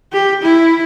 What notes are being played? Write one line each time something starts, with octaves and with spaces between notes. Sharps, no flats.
G4
E4